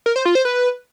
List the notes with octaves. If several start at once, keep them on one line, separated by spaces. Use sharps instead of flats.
A#4
C5
F4
C5
B4